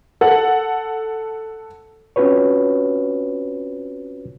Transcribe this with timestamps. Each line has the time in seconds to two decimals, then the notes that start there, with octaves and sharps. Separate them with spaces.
0.21 A4 F#5
2.16 C4 C#4 F4 F#4 B4 C#5